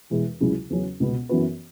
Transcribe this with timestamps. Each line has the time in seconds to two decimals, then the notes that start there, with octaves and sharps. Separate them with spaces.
0.10 E1 E2 E3 G#3
0.40 C#2 C#3 F#3 E4
0.70 E2 C#3 F#3 C#4
1.00 C#2 B2 B3
1.29 F#2 E3 B3 F#4 B4